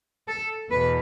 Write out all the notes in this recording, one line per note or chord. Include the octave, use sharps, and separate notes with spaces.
A4
E2 B2 B4